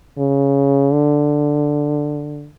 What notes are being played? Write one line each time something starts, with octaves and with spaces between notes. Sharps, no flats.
C#3
D3